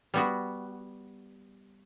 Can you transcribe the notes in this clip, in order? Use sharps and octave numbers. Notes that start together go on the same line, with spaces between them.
G3 B3 F#4